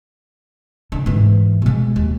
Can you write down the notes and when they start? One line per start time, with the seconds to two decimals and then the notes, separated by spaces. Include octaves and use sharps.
0.92 D3
1.06 G#2 E3
1.62 B2 G#3
1.96 D#2